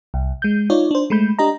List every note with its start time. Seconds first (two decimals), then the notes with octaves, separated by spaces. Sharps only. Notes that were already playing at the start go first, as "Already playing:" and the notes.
0.14 C2
0.42 G#3 G6
0.70 D#4 F4 C#5 D5
0.91 D4 C5
1.10 G#3 A3 B5 G6
1.39 D4 G4 D#5 A#5